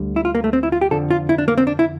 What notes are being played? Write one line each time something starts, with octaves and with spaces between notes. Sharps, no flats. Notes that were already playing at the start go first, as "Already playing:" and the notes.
Already playing: D2 D3 G3
E4
F4
A#3
A3
C4
E4
F4
G4
F2 D3 F3 A4
F4
E4
D4
A#3
C4
D4
E4